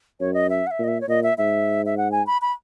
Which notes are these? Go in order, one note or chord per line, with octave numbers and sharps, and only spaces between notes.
F#2 C#5
D#5
E5
F#5
E5
A#2
D#5
E5
C#5
A#2 D#5
E5
G#2 E5
E5
F#5
G#5
B5
B5